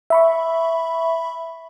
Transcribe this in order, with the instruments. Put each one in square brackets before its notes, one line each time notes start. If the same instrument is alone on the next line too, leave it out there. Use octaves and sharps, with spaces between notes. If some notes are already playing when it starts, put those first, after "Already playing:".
[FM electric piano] E5 B5 C#6